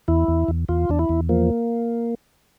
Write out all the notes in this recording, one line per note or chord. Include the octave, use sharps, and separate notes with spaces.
E2 E4
E2
E2
E2 F4
E2 D4
E4
E2
F3 A#3